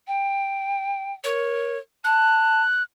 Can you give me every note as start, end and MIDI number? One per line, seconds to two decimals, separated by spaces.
0.07 1.13 79
1.24 1.75 70
1.24 1.79 73
2.04 2.62 81
2.04 2.83 90